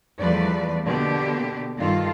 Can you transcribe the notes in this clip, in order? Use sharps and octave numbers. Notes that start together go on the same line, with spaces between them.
E2 F3 G3 A3 B4 D5
B2 D3 A#3 B3 G4
G2 D#3 G3 F4 A4